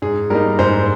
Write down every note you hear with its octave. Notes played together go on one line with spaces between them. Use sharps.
G#2 G#4
G3 A#3 D#4 A#4
G#2 C5